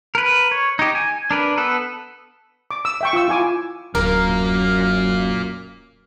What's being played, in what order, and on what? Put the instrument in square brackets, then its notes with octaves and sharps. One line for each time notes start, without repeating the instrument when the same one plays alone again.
[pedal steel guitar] A#4 B4
C#5
D#4 G4
G#5
D4 A#4 B4
B3 A4 B4
[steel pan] D6
E6
E5 G5 C#6
F4 E6
E4 F4 G#5 D6
[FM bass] D1 [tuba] F#2 [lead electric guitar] A#3 F4 [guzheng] A#4